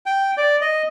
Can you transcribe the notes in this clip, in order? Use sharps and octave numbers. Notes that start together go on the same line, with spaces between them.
G5
D5
D#5